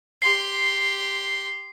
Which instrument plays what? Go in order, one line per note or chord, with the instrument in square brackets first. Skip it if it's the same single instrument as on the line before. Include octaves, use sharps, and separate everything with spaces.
[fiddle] G4 C6 [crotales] C7